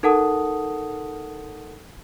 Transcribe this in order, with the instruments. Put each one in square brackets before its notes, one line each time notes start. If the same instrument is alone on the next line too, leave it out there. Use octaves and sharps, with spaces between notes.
[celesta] D#4 A4 A#4 F#5 A5 D#6